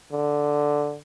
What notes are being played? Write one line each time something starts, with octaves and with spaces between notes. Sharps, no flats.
D3